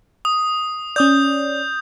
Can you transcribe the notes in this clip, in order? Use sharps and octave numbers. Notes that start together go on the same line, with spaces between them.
D#6
C#4 D5 D#6 G6